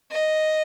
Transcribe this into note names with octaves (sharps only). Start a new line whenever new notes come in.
D#5